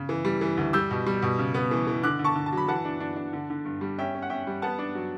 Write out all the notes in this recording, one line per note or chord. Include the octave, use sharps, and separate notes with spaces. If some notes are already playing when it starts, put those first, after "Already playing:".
Already playing: C#3
E3
G3
E3
D2
G3 E6 G6
B2
G3
B2
C#3
B3
E3
E3
D3 D6 F#6
D3
A5 C#6
D3
A5
F#3 B5
E3 F#5 A5
D4
D4
D4
D3
D3
G2
G3
C#4 E5 G5
C#4
F#5
C#4 E5 G5
G3
B3 F#5 A5
D4
F#3